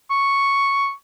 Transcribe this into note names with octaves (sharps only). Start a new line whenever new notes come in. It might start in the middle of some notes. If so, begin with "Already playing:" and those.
C#6